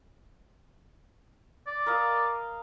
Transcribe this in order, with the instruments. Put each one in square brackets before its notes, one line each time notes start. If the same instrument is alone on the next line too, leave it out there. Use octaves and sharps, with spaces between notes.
[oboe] D5
[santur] A#4 D#5 F5